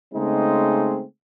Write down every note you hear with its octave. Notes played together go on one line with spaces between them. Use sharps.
C#3 G#3 A3 C4 D#4